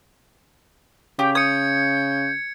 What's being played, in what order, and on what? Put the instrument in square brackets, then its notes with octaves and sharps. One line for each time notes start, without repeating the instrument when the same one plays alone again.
[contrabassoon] C#3 [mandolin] G4 [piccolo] G5
[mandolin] D#6 [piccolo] G6 [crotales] G#6 C#7